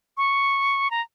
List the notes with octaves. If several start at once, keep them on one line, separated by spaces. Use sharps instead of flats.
C#6
A#5